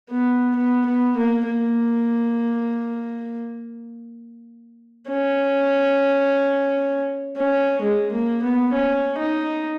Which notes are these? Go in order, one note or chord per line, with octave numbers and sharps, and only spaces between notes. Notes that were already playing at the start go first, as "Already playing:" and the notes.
B3
B3
B3
A#3
A#3
C#4
C#4
G#3
A#3
B3
C#4
D#4